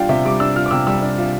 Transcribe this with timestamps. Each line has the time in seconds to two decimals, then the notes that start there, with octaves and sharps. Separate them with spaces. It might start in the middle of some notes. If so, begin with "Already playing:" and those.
Already playing: G3 D4 F4 G5
0.09 C3 E5
0.25 G3 D6
0.40 D4 E6
0.56 F4 F6
0.66 D6
0.71 C3 E6
0.87 G3 E6
1.02 D4
1.18 F4